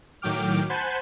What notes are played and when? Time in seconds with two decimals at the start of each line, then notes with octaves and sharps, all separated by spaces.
0.22 A2 D#3 F#3 G5 D6 F6
0.70 C5 F#5 G#5 A5 B5 G6